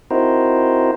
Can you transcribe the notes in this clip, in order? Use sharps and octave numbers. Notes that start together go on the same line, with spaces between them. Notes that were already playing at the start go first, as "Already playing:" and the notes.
C4 D#4 E4 F#4 A#4 C5